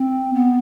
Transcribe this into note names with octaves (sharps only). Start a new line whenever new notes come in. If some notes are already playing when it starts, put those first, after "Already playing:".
Already playing: C4
B3